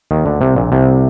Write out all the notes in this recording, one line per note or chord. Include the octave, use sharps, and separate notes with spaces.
D#2 D#3
D2 D3
C2 C3
A#1 A#2
C2 C3